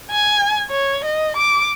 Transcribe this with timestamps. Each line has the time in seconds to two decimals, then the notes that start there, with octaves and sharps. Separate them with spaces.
0.10 G#5
0.71 C#5
1.04 D#5
1.36 D6